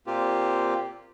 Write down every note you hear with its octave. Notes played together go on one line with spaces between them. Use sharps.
A#2 A#3 C4 F4 G4